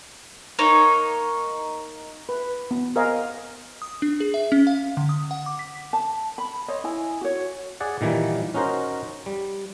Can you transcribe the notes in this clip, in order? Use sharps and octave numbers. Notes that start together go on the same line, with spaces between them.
A#3 D#4 C#5
B4
B3
A#4 C5 D#5 F5 G#5
D#6
D4
G#4
E5
C#4
F5
D3
D#6
F#5
D6
B6
A5
B5
C5 C#5 D#5
E4 D#5 G#5
F#4 C#5
G#4 D5 F#5
A#2 D#3 E3 G3 A#3
C#4 D#4 F#4 A#4 C5
G3